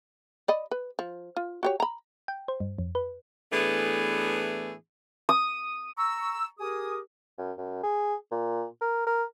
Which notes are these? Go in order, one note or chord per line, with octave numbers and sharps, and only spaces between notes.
D5 D#5 B5
B4
F3
F4
F#4 G4 C#5
A#5 B5
G5
C5
G2
F2
B4
A2 E3 A3 B3 D4 G#4
D#6
A#5 C#6 E6
G4 G#4 A#4 G#5 D#6
F#2
F#2
G#4
A#2
A#4
A#4